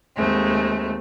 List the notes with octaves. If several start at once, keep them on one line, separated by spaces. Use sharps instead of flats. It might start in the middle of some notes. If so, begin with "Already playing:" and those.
D#2 G#3 A3 C4